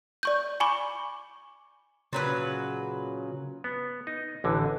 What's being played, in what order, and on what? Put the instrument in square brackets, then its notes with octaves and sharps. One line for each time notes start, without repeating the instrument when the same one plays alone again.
[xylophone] D5 C#6 G6
G#5 B5 C#6 D6
[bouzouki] A#2 F#3 B4 [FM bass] C#3
[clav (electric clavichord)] B3
D#4
A1 D3 E3